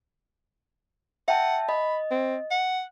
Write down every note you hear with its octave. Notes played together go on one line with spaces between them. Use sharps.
E5 F#5 G5 A5
D#5 B5
C4
F#5